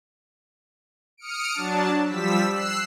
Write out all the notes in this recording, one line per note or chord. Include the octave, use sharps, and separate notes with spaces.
D#6 F6 C#7 D7
F#3 D4 A5
F3 G3 E6 B6
E6 F#6 C7